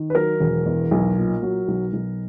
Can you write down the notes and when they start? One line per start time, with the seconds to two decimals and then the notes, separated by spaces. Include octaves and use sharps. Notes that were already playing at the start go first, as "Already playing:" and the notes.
Already playing: D#3
0.10 B4
0.15 F#3 A#4
0.40 E1
0.66 E2
0.91 B1
1.17 A#2
1.43 F#3
1.68 B1
1.93 B1